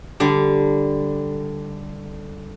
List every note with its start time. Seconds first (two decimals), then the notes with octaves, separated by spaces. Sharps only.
0.20 D3 G3